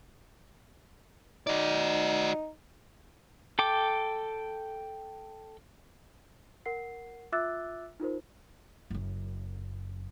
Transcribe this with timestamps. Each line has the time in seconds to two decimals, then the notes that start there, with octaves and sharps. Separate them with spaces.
1.47 D#4 F#4 D5
3.59 A4 G5 D6
6.66 A#4 F#5 C7
7.32 F4 E5 D6 E6 F#6 A6
8.00 D#4 F4 A#4 C5
8.90 F#1 F#2